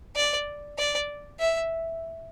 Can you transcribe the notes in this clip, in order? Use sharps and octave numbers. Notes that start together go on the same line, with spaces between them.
D5
D5
E5